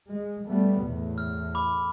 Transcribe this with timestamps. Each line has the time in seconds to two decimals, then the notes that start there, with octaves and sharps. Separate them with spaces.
0.11 G#3
0.47 G3 A3 B3
0.83 E2 A2
1.18 F6
1.55 B5 D6